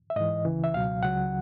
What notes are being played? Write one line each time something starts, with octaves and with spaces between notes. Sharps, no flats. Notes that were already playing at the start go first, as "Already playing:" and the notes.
E5
G#2 E3 D#5
C#2 C#3 E3
E5
C#2 B2 F#3 F5
C#2 C#3 F#3 F#5